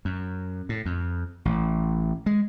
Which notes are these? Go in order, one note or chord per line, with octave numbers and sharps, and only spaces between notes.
F#2
A2
F2
A1
G#3